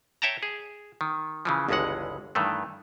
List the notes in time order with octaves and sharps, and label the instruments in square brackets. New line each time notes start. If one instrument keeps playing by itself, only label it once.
[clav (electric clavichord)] C#5 E5 G5 A5 A#5
G#4
D#3
C#3 E3 F3
G1 C#2 G2 E3 G#3 F#5
G2 D#3 E3 A3